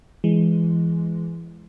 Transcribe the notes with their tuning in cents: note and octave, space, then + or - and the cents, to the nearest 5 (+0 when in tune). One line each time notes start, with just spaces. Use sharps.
E3 +25 G#3 +5